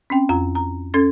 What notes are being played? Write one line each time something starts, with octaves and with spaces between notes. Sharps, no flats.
C4 C#4 G5
F2 F4 A#5
A#5
C#4 A4 G#6 A6